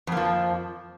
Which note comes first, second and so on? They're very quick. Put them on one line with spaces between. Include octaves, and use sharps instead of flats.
F2 A#3 F3